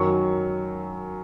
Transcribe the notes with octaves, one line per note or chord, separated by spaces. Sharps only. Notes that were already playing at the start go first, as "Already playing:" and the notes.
Already playing: F#2 D#3 F#3 C#6